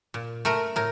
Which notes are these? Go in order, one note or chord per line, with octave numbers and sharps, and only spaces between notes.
A#2
A3 A#4
A2 A#4